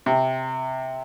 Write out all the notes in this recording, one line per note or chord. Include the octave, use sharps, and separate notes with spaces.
C3